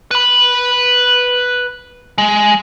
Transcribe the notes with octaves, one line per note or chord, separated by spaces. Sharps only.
B4 B5
G#3